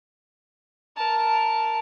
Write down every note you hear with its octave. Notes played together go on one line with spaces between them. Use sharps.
A#4 A5